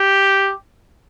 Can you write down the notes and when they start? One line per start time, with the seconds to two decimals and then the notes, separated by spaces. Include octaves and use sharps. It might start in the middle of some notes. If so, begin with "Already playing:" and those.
Already playing: G4